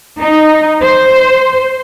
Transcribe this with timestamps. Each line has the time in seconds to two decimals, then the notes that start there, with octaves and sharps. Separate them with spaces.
0.19 D#4
0.82 C5